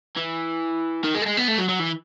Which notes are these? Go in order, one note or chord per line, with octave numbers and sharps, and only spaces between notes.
E3
D#3
G#3
A3
G#3
B3
A3
F#3
F#3
E3